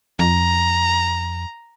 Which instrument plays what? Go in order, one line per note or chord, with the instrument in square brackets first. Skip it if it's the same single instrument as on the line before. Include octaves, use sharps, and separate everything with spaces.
[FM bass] F2 [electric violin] A#5